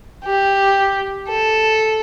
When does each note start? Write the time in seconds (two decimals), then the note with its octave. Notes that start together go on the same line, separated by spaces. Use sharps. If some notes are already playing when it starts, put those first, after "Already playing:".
0.24 G4
1.29 A4